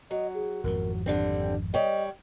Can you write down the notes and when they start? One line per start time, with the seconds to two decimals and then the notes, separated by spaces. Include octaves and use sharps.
0.11 F#3 D#5
0.34 G#4
0.64 G#1 F2 F3 A#4
1.06 D3 G3 C4 D4
1.74 G3 C#5 D#5 G5